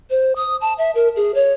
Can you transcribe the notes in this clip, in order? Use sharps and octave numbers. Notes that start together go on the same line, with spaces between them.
C5
D#6
A5
E5
A#4
G#4
C#5